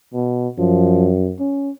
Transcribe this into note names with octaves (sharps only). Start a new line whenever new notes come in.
B2
F#2 F3
C#4